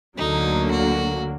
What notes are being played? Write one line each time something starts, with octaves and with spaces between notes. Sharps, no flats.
D2 D3 F#3 A#3 D#4
F#4